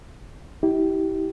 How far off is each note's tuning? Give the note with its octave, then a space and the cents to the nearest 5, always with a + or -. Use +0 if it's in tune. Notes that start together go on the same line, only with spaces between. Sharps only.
E4 -35 G4 -20